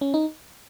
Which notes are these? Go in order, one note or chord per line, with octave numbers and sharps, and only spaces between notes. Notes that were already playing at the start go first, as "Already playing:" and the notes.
C#4
D#4